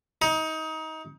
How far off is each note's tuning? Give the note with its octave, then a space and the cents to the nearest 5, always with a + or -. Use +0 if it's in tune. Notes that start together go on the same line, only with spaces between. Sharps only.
D#4 +25